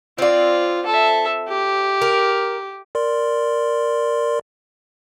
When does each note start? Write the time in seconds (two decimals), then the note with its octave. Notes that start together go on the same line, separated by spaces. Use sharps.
0.18 C4 F4 D5
0.86 A4 E5
1.48 G4
2.02 A#4
2.95 A#4 D5 C6